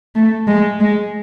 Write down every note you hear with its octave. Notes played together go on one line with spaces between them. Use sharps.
A3
G#3
G#3